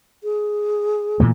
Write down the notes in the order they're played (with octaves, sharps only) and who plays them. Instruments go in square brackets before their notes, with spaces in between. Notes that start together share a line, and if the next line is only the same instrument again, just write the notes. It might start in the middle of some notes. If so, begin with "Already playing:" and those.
[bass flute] G#4
[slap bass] A#2 E3 A3